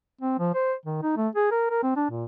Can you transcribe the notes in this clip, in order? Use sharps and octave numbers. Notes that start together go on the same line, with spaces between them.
C4
F3
C5
D#3
D#4
A3
G#4
A#4
A#4
C4
D4
A#2